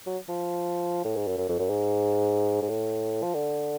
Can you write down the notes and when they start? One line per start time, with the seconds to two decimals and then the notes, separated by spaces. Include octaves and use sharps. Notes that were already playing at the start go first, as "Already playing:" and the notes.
0.06 F#3
0.29 F3
1.05 A2
1.16 G#2
1.27 F#2
1.38 F#2
1.49 F2
1.59 F#2
1.70 G#2
2.62 G#2
2.69 A2
3.23 F3
3.34 D3